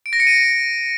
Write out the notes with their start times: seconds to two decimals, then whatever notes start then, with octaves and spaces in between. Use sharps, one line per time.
0.06 D7
0.13 A#6
0.20 C#7
0.27 D#7